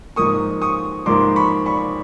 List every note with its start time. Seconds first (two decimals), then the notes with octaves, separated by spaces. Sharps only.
0.16 G#2 F3 A#3 C#6 D#6
0.62 C#6 D#6
1.06 G#2 F3 A#3 C6 D6
1.36 B5 C#6
1.66 B5 C#6